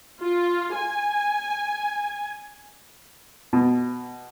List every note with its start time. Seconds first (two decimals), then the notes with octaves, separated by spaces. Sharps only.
0.21 F4
0.76 G#5
3.53 B2